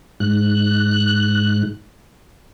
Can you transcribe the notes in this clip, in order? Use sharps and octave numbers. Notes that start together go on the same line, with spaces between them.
G#2 F#6